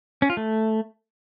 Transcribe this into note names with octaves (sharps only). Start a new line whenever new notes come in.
C#4
F4
A3